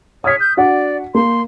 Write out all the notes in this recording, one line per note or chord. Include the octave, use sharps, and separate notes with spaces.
C#5 D#6 F6 B6
G6
D4 F#4 D5 F#5
A#3 C6